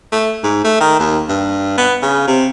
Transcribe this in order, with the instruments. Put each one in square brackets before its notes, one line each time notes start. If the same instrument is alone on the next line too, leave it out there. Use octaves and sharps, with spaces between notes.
[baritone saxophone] A3
G#2
A3
D#3
D#2
G2
B3
C#3
C3